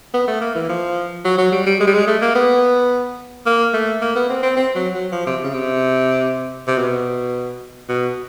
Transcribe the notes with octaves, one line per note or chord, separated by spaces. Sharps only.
B3
A3
A#3
E3
F3
F#3
F#3
G3
G3
G#3
G3
G#3
A3
A#3
B3
A#3
A3
A#3
B3
C4
C4
C4
F#3
F#3
F3
C3
C#3
C3
C3
B2
B2